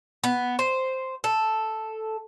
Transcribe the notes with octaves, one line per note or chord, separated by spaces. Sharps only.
B3
C5
A4